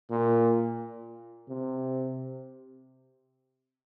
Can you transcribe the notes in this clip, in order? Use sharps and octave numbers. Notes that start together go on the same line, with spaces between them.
A#2
C3